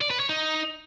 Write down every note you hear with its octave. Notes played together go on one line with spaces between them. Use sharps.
D5
B4
C#5
D#4